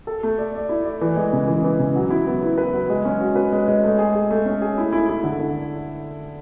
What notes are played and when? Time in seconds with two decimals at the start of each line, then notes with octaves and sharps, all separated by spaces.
0.07 A4
0.23 A3
0.38 D5
0.55 D5
0.69 E4
0.85 D5
1.01 E3
1.17 G#3
1.33 C#3
1.48 E3
1.64 E3
1.79 C#3
1.96 F#3
2.11 E4
2.27 B3
2.43 E4
2.58 B4
2.73 F#3
2.90 G#3
3.05 C#4
3.20 F#4
3.36 B4
3.52 G#3
3.68 G#3
3.84 A3
3.98 G#4
4.15 G#4
4.31 A3
4.45 C#4
4.62 G#4
4.78 E4
4.93 E4
5.09 E4
5.24 D3
5.39 D3